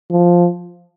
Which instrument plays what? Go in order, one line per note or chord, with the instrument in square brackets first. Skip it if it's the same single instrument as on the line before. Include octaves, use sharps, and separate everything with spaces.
[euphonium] F3